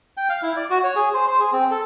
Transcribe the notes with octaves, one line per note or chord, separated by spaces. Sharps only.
G5
F5
E4
D5
F#4
C#5
G#4
C5
C5
G#4
C4
A4